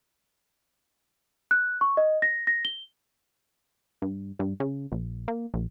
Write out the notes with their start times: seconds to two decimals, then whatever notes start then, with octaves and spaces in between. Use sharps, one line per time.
1.51 F#6
1.81 C#6
1.97 D#5
2.22 A#6
2.47 A#6
2.65 G7
4.02 G2
4.39 G2
4.60 C#3
4.92 A#1
5.28 A#3
5.54 A#1